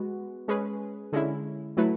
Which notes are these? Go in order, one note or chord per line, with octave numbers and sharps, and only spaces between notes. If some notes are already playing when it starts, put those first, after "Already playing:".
Already playing: G#3 B3 F#4
G#3 C#4 G#4 B4
D3 G#3 C#4 E4
F#3 A3 E4 B4